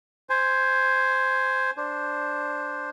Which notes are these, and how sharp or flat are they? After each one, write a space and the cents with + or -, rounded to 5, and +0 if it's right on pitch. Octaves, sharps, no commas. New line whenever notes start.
C5 +0 G#5 +0
D4 +0 C5 +0